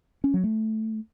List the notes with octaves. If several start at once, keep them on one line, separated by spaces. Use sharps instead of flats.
C#4
F#3
A3